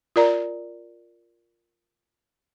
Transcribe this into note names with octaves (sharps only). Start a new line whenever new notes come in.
F4 A#4 D5 A#5